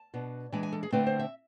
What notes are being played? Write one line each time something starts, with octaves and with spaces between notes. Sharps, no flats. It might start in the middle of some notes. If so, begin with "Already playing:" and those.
Already playing: A5
B2 B3 D4
E3 G#3 D4 G#5
G#5
A4
G#4
D3 A3 C4 B4
C5
E5